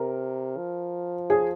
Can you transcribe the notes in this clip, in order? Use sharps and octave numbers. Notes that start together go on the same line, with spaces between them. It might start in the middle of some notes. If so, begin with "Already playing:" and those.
Already playing: C3 A#4
F3
G#4